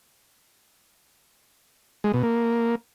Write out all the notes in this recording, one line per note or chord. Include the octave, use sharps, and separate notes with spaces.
G#3
B2
A#3